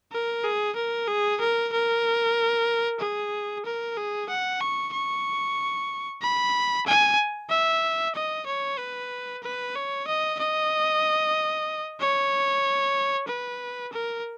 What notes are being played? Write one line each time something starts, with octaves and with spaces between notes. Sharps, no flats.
A#4
G#4
A#4
G#4
A#4
A#4
G#4
A#4
G#4
F#5
C#6
C#6
B5
G#5
E5
D#5
C#5
B4
B4
C#5
D#5
D#5
C#5
B4
A#4